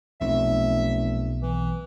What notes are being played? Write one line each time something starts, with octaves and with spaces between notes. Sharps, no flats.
F1 B1 E5
E3